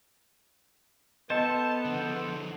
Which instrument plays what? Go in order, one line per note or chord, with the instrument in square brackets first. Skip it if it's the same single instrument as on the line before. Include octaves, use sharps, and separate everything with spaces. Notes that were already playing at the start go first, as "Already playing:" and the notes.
[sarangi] B3 [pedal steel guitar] A4 C5 [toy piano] D#5 [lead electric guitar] A5
[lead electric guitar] D3 F3